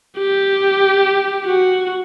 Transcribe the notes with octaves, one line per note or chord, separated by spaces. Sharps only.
G4
F#4